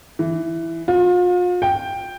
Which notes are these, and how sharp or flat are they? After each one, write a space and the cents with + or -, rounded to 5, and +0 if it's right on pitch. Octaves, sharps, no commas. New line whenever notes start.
E3 +5
F4 +40
G5 +5